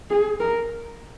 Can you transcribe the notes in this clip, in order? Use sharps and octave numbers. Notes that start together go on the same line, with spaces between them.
G#4
A#4